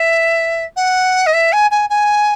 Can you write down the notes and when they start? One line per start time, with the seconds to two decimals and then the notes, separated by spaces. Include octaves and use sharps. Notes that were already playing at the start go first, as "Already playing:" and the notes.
Already playing: E5
0.76 F#5
1.26 D#5
1.33 E5
1.52 G#5
1.71 G#5
1.89 G#5